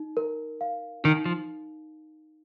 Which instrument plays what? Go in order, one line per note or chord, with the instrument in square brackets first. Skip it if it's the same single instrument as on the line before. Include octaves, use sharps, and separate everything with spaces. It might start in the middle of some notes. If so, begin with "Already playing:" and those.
Already playing: [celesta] D#4
A#4
F5
[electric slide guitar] D#3 [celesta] D#4
[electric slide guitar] F3